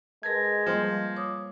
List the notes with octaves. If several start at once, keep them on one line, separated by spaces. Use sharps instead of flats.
G#3 A#4 B4 A5 G#6 A#6
F3 G3 A#3
C#5 D6 D#6